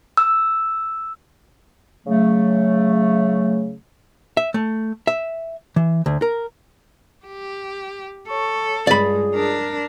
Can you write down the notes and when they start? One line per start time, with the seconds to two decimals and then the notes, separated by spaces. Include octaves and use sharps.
0.17 E6
2.06 C#3 F#3 A3
4.37 E5
4.54 A3
5.07 E5
5.76 E3
6.06 D2
6.22 A#4
7.26 G4
8.28 A4 C#5 C#6
8.87 C#2 G2 G#3 G#4 D5 B5
9.34 D4 A#4